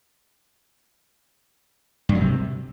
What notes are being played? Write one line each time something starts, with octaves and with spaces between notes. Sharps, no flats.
G2
F#3
C3